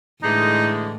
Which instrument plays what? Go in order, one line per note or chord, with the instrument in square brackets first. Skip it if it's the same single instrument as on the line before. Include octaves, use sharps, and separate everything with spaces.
[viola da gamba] A2 [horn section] D3 E3 G#3 [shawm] D#4